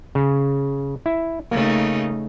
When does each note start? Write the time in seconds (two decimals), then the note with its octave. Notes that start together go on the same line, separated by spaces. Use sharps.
0.15 C#3
1.06 E4
1.51 C#3 A3 A#3 D#4